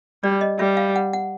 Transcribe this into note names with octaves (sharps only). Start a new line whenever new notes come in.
G3 D5
D#5
G3 E5
F5
F#5
F#5